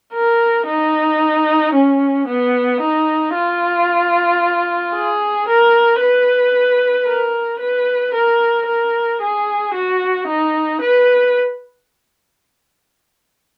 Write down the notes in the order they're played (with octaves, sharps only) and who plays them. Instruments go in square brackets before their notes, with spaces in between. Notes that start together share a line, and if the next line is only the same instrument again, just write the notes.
[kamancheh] A#4
D#4
C#4
B3
D#4
F4
G#4
A#4
B4
A#4
B4
A#4
A#4
G#4
F#4
D#4
B4